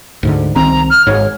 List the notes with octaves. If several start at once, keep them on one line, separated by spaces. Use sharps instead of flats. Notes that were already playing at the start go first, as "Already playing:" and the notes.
D2 G#2 D3
C2 D#3 C4 A#5
F6
G#1 G#2 C#5